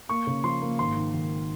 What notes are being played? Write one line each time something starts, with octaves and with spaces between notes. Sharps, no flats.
A#3 C#6
C#3
F3 C6
A#3
G#1 C6
D#3
G#1